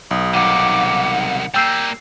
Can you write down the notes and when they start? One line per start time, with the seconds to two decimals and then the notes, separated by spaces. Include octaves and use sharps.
0.11 B1 D#6
0.34 C2 D#3 F#5 D6
1.54 G3 A#3 G5 E6 G6 C7